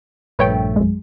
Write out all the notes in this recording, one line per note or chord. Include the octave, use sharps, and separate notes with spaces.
A#1 G2 A3 B4 C#5 G5
F#2 G#3